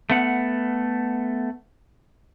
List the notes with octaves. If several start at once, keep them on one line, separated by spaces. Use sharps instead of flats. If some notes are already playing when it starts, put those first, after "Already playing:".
A3 B3 F#5